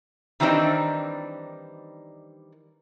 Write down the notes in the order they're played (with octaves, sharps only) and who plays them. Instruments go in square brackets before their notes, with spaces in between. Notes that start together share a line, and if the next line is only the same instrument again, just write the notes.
[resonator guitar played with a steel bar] D#3 E3 G3 C4 D4 D#4